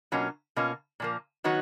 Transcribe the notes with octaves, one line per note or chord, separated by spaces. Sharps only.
B2 F#3 A#3 C#4 F4
B2 A#3 C#4 F4
A#2 F3 A#3
D#3 F#3 B3 D#4 F#4